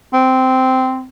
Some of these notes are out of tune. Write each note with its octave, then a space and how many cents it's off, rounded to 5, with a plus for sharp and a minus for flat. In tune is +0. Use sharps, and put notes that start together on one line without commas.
C4 -10